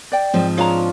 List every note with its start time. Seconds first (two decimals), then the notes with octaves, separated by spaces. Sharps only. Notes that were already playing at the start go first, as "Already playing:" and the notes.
0.12 D5 G5
0.33 G#2 F3 C4
0.57 D4 F4 G#4 C#5 A#5